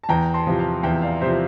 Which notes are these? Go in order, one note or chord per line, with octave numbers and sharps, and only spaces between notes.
A5
E2 G5 A#5
A5 C6
C3 F3
F5 A5
E2 E5 G5
D5 F5
C3 F3 C5 E5